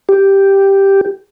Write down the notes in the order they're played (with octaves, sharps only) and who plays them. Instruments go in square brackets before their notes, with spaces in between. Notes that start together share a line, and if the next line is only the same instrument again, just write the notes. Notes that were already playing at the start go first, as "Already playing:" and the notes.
[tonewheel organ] G4